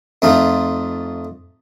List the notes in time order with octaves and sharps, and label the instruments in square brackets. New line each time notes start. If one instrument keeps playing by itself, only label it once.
[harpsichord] F2 A3 D#4 F4